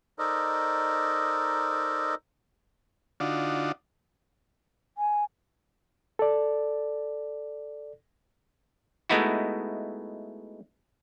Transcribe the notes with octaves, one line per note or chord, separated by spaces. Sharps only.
D#4 A4 A#4 C5 D5 D#5
D3 D4 D#4 F4 F#4
G#5
A4 D5
G#3 A3 B3 D#4 E4 F#4